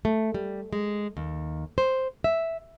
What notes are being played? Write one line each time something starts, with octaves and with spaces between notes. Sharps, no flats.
A3
G3
G#3
D#2
C5
E5